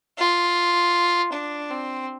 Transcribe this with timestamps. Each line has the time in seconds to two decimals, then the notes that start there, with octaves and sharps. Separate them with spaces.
0.19 F4
1.33 D4
1.71 C4